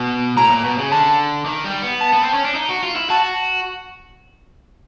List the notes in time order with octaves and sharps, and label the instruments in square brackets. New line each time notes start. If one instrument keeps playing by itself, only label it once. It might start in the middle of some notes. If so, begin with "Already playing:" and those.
Already playing: [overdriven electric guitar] B2
[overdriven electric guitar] A2 [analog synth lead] A#5
[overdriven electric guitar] A#2
B2
C#3
[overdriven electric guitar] D3 [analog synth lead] A5
[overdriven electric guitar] D#3
G3
B3
[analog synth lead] A5
[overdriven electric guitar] B3
C4
C#4
D4
D#4
F#4
F4
E4
[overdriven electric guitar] F#4 [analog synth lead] A5